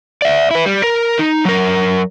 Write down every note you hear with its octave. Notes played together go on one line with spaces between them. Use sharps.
D5 E5
E4 B4
G3
A#4
D#4
F#3 A#4